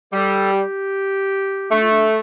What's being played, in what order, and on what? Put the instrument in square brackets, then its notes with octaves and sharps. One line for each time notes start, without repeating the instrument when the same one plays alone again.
[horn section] G3 [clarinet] A4
[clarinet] G4
[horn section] A3 [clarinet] D4
[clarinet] F4
D4